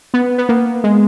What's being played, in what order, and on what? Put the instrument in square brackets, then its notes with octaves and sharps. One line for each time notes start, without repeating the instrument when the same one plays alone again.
[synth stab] B3
B3
A#3
G#3